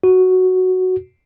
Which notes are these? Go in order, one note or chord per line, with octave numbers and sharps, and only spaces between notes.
F#4